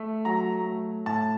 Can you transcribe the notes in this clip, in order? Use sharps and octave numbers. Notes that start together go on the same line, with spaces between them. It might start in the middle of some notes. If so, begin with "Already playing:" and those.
Already playing: A3
F#3 A#5
A3
A2 A5